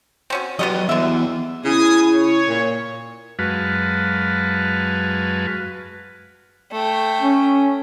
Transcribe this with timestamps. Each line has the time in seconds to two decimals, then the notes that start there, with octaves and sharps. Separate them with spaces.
0.30 C4 C#4 F#4
0.59 F#3 B3 C#4 G4 D#5
0.89 D3 E3 B3 E5
1.65 C#3 E4 G#5 D#6
2.13 C#5
2.48 A#2
3.39 F#2 G#3 F#4 B4 F5 A5
6.72 A3 G5
7.21 C#4